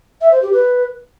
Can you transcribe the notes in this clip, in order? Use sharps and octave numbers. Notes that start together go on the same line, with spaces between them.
E5
C5
G4
B4